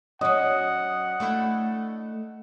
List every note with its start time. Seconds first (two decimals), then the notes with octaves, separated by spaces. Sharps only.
0.21 F#3 C#4 D#5 F#5
1.20 A3 D4 E4